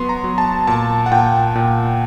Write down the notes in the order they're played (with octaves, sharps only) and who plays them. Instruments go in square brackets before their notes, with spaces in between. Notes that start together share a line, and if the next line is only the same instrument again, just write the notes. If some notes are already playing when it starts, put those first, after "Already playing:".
Already playing: [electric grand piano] F#3 B3 C6
A#5
F#3
A5
A#2 A5
F#5
A#2 G5
A#2